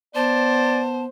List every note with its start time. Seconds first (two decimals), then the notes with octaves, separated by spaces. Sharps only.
0.15 B3 C5 D5 A5